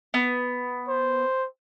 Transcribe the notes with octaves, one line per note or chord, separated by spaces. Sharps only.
B3
C5